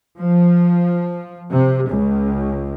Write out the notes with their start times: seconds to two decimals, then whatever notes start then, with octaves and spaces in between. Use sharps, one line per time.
0.19 F3
1.51 C3
1.89 C#2